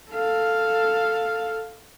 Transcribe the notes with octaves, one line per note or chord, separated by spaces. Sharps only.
A4 F5